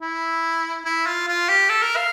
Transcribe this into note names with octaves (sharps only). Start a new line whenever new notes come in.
E4
E4
F4
F4
G4
A4
A#4
F5